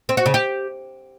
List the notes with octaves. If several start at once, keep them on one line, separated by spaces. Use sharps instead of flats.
C4
F#4
C#3
G4